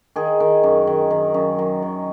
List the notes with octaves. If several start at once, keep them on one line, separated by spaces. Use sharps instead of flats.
D#3 G#4
D#3
F#2
D#3
D#3
F#2
F#3
D#3